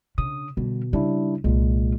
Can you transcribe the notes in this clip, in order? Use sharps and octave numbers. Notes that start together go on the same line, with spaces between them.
C#3 D4 D#6
B2 D3 G3
C#3 G3 D4 E4
C2 A#2 G#3 F4